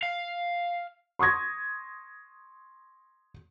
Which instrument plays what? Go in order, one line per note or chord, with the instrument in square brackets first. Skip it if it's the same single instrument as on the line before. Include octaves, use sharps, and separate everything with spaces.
[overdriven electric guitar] F5
[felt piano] C6 C#6 D#6 G#6 A#6